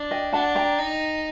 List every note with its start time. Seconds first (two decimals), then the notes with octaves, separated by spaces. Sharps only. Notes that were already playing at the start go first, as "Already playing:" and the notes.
Already playing: D4
0.11 D#5 G5
0.32 D4 F#5 A5
0.55 G5 A#5
0.79 D#4